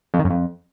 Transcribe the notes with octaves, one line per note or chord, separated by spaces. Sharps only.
F2
D#3
F#2
F2